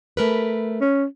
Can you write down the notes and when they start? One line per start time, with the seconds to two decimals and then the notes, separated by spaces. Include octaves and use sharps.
0.17 A3 A#4 B4
0.81 C#4